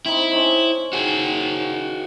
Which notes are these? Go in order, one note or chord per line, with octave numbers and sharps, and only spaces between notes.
C4 D#4 E4
C#4 D#4 C5
D#3 F#4 G#4